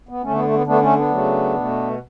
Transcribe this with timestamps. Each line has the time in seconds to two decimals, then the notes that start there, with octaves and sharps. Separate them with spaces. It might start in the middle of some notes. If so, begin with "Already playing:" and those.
0.09 B3
0.23 D3 A3 C#4
0.34 B3
0.44 A3
0.54 B3
0.66 D3 A3 B3 D4
0.81 A3 C#4
0.96 B3 D4
1.11 C#3 F#3 A3
1.55 B2 A3